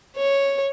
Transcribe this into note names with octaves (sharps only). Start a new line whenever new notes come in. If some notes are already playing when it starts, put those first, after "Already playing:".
C#5